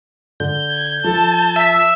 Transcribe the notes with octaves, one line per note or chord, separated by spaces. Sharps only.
D3 G6
G#6
F3 A4 A5
E5